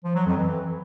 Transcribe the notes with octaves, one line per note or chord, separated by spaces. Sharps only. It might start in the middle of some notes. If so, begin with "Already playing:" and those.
F3
F#3
F2
E3